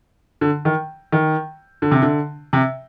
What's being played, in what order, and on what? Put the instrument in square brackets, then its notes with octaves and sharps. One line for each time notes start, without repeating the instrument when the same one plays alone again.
[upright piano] D3
D#3
D#3
D3
C3
D3
C3